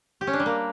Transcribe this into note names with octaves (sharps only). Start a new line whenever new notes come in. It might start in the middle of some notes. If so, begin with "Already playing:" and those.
G4
C#4
D4
G3
A#3